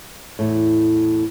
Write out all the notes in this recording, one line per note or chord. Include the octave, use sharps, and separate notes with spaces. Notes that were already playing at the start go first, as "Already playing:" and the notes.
E2 A2